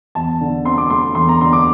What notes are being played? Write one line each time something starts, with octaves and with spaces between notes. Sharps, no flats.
E2 A5
D3
C4 C6
D6
A3 C6
E2 C6
A#5
D3 C6
D6